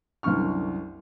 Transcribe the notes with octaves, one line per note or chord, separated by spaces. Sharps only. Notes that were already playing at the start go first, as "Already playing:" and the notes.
C2 F#2 D3 C#6 F6